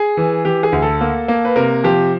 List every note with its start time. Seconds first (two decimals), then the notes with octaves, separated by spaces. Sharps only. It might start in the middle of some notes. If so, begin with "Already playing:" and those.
Already playing: G#4
0.17 E3
0.45 E3 G4
0.63 G#4
0.72 D2
0.82 A4
1.01 A#3
1.28 A#3
1.45 B4
1.56 C3 A#4
1.84 F3 G4